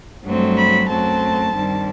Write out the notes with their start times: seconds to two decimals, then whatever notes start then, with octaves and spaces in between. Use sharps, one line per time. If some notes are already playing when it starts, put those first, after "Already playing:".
0.25 G2 F#3 A3 C4
0.57 B5
0.89 F#2 F#3 A3 C4 A5
1.54 G2 D#3 G3 C4